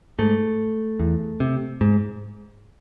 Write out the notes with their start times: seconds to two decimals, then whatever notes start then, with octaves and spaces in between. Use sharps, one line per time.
0.19 G#2 A3
0.99 E2
1.40 C3
1.81 G#2